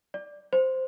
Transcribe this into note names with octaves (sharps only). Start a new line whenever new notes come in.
D5
C5